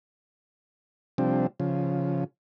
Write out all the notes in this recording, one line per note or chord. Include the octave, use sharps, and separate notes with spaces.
C3 F3 G3 C4 D4
C#3 F3